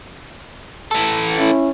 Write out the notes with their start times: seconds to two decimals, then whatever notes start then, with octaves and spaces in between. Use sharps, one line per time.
0.91 E3 A4
1.36 C#4 E4